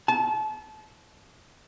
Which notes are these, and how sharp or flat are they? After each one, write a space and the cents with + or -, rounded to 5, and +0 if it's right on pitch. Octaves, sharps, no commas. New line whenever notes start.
A5 -30